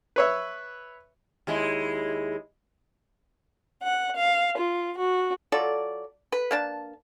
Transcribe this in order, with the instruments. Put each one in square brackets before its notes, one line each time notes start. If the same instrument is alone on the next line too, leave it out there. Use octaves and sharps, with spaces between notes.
[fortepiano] B4 C#5 E5
[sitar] D#2 G#3 E4
[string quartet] F#5
F5
F4
F#4
[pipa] F#3 F4 A4 D5
B4
A#3 D4 A5